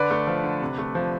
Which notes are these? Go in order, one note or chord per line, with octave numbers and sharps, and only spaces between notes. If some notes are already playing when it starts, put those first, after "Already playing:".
Already playing: D3 B4 D5
A3
F3
D3
C3
A3
F3